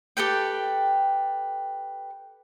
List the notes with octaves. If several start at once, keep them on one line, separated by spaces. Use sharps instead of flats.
G4 A4 B4 G5